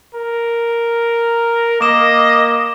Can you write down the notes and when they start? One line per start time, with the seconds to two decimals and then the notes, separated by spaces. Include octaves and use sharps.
0.15 A#4
1.81 A#3 D#5 D6 E7